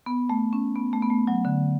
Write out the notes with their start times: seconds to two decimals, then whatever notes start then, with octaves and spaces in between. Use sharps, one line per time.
0.06 B3
0.29 A3
0.53 C#4
0.75 B3
0.93 A3
1.02 B3
1.10 A3
1.27 F#3
1.45 D3